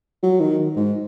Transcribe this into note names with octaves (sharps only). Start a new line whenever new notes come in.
F#3
D#3
G#2